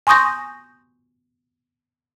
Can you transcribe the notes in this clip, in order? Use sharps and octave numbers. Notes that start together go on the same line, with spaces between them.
G#5 C6 C#6 D#6 G6 A#6